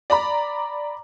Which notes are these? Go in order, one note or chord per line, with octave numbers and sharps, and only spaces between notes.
D5 A#5 B5